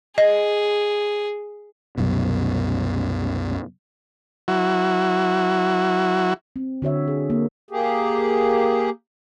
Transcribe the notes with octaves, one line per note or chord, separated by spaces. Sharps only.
G#4 D#5
C2 F#2 B2
F#3 E4 F#4
C4
D3 F#4 C#5 E5
G#4
A#3
A#3 G4 G#4